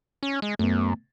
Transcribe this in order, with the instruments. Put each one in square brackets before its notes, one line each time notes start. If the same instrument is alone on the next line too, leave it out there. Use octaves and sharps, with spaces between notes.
[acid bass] C#4
G#3
[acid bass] F#2 [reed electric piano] A3 B3